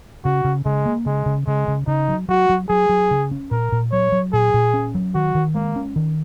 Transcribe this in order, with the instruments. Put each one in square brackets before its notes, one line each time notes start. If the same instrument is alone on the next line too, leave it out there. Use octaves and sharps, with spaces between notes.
[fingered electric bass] C#3 [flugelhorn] F#4
[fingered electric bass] C#3
[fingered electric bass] C#3 [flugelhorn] G#3
[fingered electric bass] A#3
[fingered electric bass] C#3 [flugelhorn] G#3
[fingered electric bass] C#3
[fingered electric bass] C#3 [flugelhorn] G#3
[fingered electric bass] C#3
[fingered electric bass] C#3 [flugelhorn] D#4
[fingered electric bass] F#3
[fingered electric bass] F#3 [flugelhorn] F#4
[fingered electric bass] F#3
[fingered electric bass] F#3 [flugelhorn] G#4
[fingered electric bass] F#3
C#3
C#4
[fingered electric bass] A#2 [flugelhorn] A#4
[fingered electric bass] A#2
[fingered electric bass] F#3 [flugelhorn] C#5
[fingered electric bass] F#3
[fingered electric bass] A#2 [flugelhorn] G#4
[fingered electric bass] A#2
C#4
F#3
[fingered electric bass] D#3 [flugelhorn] F#4
[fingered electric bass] D#3
[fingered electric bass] G#3 [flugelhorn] A#3
[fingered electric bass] C#4
D#3